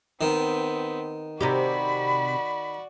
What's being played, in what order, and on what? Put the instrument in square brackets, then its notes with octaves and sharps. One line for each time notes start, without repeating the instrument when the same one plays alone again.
[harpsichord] D#3 [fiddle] B3 C4
[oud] C3 D#4 G4 [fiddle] F#4 D5 [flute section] B5